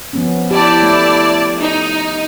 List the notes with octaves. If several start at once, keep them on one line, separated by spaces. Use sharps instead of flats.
F3 B3 C#4
E4 G4 D5 A5
A3
D#4